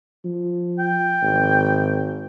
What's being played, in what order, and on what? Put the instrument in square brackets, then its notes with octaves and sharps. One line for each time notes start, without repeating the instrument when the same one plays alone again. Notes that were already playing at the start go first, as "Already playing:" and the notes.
[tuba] F3
[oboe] G5
[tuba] G#1